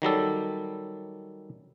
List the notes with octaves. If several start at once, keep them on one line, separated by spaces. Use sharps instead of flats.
D#3 F#3 G3 A4